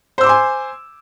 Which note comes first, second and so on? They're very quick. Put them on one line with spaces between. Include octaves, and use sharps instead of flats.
C5 E6 D6 C6 G#5